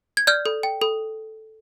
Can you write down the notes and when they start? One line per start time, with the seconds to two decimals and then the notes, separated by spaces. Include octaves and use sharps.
0.17 G#6
0.27 D5 F6 G6
0.46 A4
0.63 G5
0.81 A4